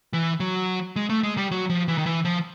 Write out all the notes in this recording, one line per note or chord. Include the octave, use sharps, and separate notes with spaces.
E3
F#3
G#3
A3
G#3
G3
F#3
F3
E3
D#3
E3
F3